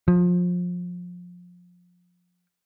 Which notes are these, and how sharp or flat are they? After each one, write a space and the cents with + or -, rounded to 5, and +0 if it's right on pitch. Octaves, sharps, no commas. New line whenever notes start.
F3 +25